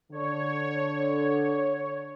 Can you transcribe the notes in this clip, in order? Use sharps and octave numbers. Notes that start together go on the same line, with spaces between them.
D3 C#5